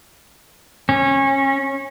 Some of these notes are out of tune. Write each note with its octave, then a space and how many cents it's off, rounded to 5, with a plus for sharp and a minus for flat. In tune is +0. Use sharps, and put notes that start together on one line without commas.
C#4 -25